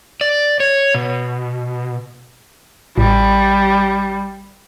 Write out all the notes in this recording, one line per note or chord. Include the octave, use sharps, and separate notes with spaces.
D5
C#5
B2
A1 G3